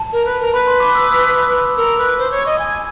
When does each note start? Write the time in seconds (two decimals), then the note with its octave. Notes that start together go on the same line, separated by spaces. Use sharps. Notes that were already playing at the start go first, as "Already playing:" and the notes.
Already playing: A5
0.12 A#4
0.25 B4
0.40 A#4
0.54 B4 B5
0.68 C6
0.80 D6
0.95 E6
1.03 D#6
1.10 E6
1.77 A#4 E6
1.98 B4
2.18 C5
2.31 C#5
2.46 D#5
2.59 G#5